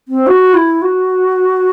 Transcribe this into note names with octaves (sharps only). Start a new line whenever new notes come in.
C4
F#4
E4
F#4